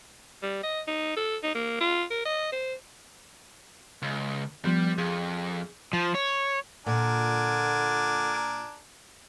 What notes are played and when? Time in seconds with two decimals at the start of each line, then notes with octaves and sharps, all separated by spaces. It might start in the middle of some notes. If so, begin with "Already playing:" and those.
0.42 G3
0.63 D#5
0.87 D#4
1.16 A4
1.43 D#4
1.55 A#3
1.80 F4
2.10 A#4
2.25 D#5
2.52 C5
4.02 C#2
4.65 F3 G3 B3
4.98 F2 G#4
5.93 F3
6.15 C#5
6.86 A#2 D3 D4 A#4 G#5